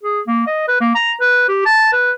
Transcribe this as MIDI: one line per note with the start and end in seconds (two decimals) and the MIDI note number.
0.04 0.20 68
0.27 0.42 58
0.47 0.65 75
0.68 0.77 71
0.81 0.92 58
0.95 1.13 82
1.21 1.44 71
1.49 1.64 67
1.65 1.89 81
1.93 2.12 71